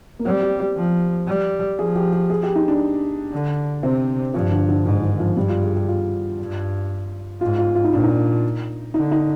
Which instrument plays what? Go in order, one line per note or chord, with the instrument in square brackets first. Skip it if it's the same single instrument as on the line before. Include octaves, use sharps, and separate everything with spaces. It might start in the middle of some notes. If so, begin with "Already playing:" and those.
[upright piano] A#3
[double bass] G3 [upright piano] C4
[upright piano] G4
G4
[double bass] F3
G3
[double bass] F3 [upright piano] G#4
[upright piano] G4
G4
G#4
G4
D#4
D4
[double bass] D3
[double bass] C3 [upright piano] C4
[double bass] G2 [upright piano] F3
[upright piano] D3
D3
[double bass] G#2 [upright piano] D3
[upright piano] D#3
F3
[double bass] G2 [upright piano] G3
[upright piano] F4
G#4
G4
F4
[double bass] G2
[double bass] G#2 [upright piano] F4
[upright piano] F4
F4
D#4
[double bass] A#2 [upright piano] D4
[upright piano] D#4
[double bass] D3 [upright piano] D#4
[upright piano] D#4